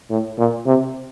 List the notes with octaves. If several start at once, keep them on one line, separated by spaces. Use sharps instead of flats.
A2
A#2
C3